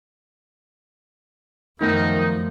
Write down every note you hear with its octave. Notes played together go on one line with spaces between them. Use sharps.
F#2 D#3 F3 A3 B3 D#4 A#4